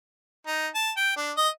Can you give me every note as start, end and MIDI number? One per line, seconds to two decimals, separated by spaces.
0.47 0.68 63
0.75 0.91 81
0.97 1.17 79
1.17 1.32 62
1.37 1.49 75